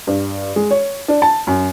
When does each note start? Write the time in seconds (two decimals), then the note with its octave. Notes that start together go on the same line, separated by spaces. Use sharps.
0.07 G2
0.56 G#3
0.71 C#5
1.08 D4
1.22 A5
1.47 F#2